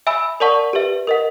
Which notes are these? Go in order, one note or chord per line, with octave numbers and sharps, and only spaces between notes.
E5 G#5 B5 E6
A#4 D5 F#5 A5 C#6
G4 B4 E5
A#4 D#5 F#5